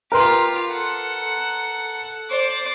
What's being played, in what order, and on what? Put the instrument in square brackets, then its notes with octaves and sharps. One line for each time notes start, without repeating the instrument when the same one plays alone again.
[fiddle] F4 G4 [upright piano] A#4 B4 C6
[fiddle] A4 F#5
C5 D5